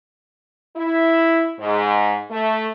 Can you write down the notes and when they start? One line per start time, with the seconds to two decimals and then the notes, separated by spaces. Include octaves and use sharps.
0.77 E4
1.59 G#2
2.31 A3